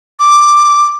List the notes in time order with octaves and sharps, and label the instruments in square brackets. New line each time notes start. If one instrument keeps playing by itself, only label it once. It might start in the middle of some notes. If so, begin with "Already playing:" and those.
[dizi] D6